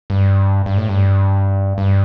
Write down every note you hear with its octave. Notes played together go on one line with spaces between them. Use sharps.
G2
G2
A2
G2
G2